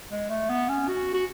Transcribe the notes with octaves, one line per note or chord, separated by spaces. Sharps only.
G#3
A3
B3
C#4
F#4
F#4